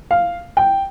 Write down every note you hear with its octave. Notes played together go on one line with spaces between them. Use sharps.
F5
G5